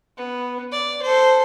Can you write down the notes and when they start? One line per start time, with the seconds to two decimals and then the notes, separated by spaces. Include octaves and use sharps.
0.17 B3
0.72 D5
1.02 A4 C5